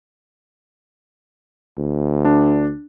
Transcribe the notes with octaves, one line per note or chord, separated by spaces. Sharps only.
D2
D4